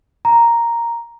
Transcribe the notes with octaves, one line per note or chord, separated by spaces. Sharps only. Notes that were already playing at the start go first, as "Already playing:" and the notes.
A#5